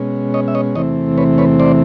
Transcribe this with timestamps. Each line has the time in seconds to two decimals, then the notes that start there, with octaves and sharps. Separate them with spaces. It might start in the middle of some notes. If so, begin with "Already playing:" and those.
Already playing: B2 G#3 C#4
0.34 C#5 D#5
0.48 E5
0.55 C#5 D#5
0.75 E2 C3 E3 A3 C4 C#5 D#5
1.18 B4 C#5
1.38 B4 C#5
1.60 C5 D5